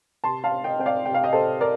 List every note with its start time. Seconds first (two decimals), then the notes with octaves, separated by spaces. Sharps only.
0.24 C3 A5 C6
0.44 F5 A5
0.51 C4
0.64 D#5 G5
0.79 C4 G5
0.86 D5 F5
1.06 C3 G5
1.14 F5
1.23 D#5 G5
1.33 C3 A4 C5
1.61 A#4 D5